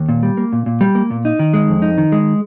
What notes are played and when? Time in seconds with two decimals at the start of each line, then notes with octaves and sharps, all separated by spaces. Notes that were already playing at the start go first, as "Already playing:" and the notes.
Already playing: D#2
0.09 A#2
0.23 G3
0.37 A#3
0.53 A#2
0.66 A#2
0.81 G3
0.95 A#3
1.11 A#2
1.25 D#4
1.39 D#3
1.54 G#3
1.68 F2
1.82 D#4
1.98 D#3
2.12 G#3